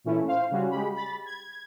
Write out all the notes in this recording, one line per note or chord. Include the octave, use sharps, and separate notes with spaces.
A#2 E3 A3 C#4 E4
C5 F5
C#3 G3 C#4 F#4
G#3 G4 B5
B5 A6
G#6